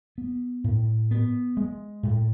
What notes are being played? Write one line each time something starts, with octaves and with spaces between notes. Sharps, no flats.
B3
A2
B3
G#3
A2